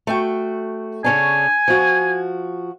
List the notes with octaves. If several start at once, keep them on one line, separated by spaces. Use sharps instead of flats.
A3 F#4 G5
C#3 C#4 D4 G#5
F3 F#4